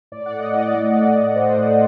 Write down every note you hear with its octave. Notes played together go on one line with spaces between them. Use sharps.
A2 D5
F#5
A2
D#5
A2 D5
A3
A3 D5
A2
A3 C5
A2